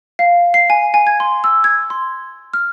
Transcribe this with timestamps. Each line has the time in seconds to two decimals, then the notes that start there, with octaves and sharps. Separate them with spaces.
0.19 F5
0.54 C7
0.70 G#5
0.94 G#5
1.07 G#6
1.20 C6
1.44 E6
1.64 G#6
1.90 C6
2.54 F6